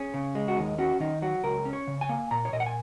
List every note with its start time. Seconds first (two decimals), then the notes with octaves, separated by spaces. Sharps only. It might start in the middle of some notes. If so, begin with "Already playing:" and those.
Already playing: C#4 G#4
0.14 C#3
0.35 G#3
0.48 F#4
0.57 D#2 D#4
0.78 C#4 F#4
1.00 D#3 D#4
1.22 F#3 F#4
1.44 C#2 A#4
1.65 C#4
1.73 C#5
1.87 C#3
2.01 G#5
2.09 A#3
2.31 A#2 A#5
2.45 C#5
2.53 A#2 D#5
2.60 F#5
2.66 G#5